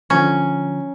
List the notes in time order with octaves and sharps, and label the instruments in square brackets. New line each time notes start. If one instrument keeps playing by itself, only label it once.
[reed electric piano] D3 F3 A#5 [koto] C#4